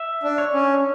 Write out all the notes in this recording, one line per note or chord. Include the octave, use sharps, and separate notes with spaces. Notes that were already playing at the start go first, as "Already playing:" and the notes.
Already playing: E5
D4
C#5
C#4